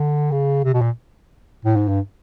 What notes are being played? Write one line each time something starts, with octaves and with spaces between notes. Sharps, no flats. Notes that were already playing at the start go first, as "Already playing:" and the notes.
Already playing: D3
C#3
C3
B2
A#2
A2
G#2
G2